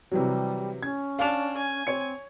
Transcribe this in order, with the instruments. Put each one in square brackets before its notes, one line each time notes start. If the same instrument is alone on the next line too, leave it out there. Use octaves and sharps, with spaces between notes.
[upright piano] C3 E3 F#3 [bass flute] G3
[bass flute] C#4 [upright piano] G#6
[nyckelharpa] D4 [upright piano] F5 F7
[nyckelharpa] G#5
[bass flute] C4 [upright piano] C#5 C#7